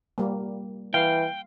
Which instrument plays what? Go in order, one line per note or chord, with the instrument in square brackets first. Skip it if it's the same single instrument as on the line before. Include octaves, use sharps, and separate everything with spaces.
[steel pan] G3 A#3
[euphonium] E3 [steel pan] F5 [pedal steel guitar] G5